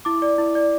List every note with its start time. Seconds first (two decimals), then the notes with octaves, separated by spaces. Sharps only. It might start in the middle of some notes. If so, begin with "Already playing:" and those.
0.05 E4 D6
0.22 D5
0.38 E4
0.55 D5